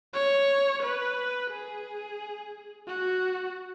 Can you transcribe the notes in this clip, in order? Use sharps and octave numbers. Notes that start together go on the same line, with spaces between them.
C#5
B4
G#4
F#4